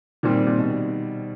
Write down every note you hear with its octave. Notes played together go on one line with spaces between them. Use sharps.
A#2 D#3 G3 C4
A#2
B2